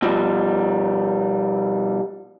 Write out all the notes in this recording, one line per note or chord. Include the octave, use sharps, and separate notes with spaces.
B2 F3 G3